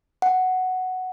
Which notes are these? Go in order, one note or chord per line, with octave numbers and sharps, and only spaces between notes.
F#5